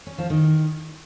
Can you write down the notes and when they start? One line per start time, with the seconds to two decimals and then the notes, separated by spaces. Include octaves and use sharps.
0.07 C#4
0.18 F3
0.30 D#3